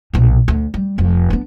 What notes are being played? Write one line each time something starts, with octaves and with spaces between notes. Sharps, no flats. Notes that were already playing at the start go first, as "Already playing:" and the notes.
B1 A#2
D2
G3
F1 F2
B3 D4